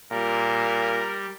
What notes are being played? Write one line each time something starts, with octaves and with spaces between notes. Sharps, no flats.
A#2 G3 A#4